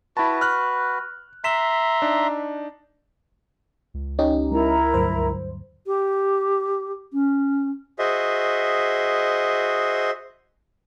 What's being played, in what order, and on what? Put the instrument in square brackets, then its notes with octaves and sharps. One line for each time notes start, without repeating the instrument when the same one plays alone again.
[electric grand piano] E4 A5 [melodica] F#4 B4
[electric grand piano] F6 F#6
[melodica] E5 A#5 C6 [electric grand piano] B6 E7
[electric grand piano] D4 D#4
[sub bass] C#2
[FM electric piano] C#4 D#4 G4
[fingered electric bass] G#3 [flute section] E4 A#4 A#5
[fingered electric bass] D2 G2 F#3 [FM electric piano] C5
[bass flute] G4
C#4
[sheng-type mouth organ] F#4 G#4 C5 D#5 E5